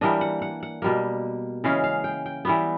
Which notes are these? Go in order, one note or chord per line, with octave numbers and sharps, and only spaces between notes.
E3 G3 A#3 D4 D#5
F#5
F#5
F#5
B2 G3 A#3
C#3 E3 G#3 C#4 F5
F5
G5
G5
E3 G3 B3